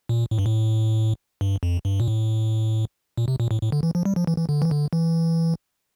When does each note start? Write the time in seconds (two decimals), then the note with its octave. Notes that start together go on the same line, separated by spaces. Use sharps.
0.09 A#2
0.31 A2
0.39 G2
0.46 A2
1.41 G2
1.63 F2
1.85 G2
2.00 A#2
2.08 A2
3.17 A#2
3.28 C3
3.40 A#2
3.51 A2
3.62 A2
3.72 D3
3.83 E3
3.95 F3
4.05 G3
4.16 F3
4.27 E3
4.38 E3
4.49 D3
4.62 E3
4.71 D3
4.93 E3